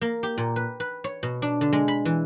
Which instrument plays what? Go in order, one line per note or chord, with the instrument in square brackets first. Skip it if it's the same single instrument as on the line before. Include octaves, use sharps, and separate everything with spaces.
[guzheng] A#3
G4
A#2
B4
B4
C#5
B2
D4
D3
G#3
B5
E3